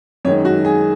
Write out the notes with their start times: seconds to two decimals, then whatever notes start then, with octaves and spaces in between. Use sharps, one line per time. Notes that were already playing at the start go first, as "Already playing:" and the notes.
0.25 F#2 D#3 G#3 C#5
0.45 F#4
0.65 G#4